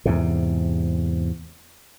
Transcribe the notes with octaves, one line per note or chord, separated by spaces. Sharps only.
E2 G#2 C3